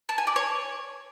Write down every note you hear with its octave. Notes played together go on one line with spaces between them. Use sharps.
A5
G#5
D5
C#5